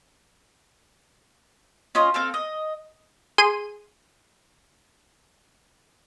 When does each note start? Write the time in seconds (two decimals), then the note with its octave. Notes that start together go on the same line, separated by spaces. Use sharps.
1.95 C#4 F4 D#5
2.14 C4 A4 F5
2.34 D#5
3.38 G#4 C6 D#7